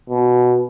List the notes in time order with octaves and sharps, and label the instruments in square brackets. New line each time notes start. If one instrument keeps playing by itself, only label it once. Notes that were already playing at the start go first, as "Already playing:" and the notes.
[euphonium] B2